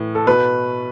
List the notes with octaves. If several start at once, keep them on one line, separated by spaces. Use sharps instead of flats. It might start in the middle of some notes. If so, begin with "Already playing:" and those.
Already playing: A2 E3
A4
B2 B4